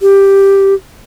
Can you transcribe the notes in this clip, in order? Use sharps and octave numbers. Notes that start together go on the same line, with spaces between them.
G4